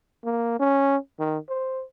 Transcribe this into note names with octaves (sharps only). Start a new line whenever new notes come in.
A#3
C#4
D#3
C5